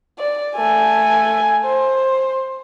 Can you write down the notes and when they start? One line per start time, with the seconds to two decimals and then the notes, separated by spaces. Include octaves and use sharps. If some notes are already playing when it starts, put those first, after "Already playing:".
0.19 D5
0.56 A3 G#5
1.65 C5